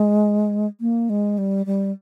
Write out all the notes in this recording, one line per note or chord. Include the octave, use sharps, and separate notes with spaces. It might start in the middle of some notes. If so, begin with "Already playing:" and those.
Already playing: G#3
A#3
G#3
G3
G3